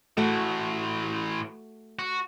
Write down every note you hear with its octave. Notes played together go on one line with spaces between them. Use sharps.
A2 E3 A3 F#4
F#4